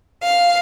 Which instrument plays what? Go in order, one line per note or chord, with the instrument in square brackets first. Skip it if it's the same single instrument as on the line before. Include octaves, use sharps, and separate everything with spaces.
[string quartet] F5